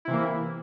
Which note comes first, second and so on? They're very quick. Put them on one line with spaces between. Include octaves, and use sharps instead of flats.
E4 C3 E3 A#3